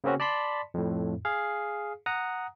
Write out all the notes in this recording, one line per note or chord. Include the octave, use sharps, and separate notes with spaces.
C#3 A#3 C4 C#4 F#4
D5 A5 B5 C6 B6
F2 A2
G#4 F5
F#5 A#5 D#6